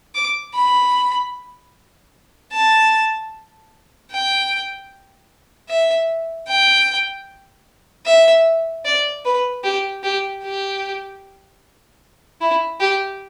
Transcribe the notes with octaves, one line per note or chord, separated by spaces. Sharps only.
D6
B5
A5
G5
E5
G5
E5
D5
B4
G4
G4
G4
E4
G4